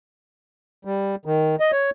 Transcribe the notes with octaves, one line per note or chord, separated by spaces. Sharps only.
G3
D#3
D#5
C#5